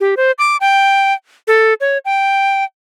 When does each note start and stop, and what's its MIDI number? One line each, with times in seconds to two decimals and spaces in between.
0.01 0.15 67
0.17 0.32 72
0.38 0.57 86
0.61 1.13 79
1.48 1.74 69
1.81 1.98 73
2.05 2.64 79